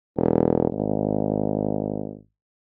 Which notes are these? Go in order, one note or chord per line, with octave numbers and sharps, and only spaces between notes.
E1
G#1